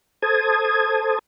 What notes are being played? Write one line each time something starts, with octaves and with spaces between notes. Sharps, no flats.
A4 C5 A5 D#6 G#6